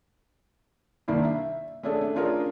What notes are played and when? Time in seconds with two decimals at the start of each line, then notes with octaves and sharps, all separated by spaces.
1.08 C2 D#3 A#3 D4 E4
1.25 E5
1.83 A3 C#4 D4 G#4 A4
2.01 A3
2.15 C#4 D4 F4 G#4 A#4 C#5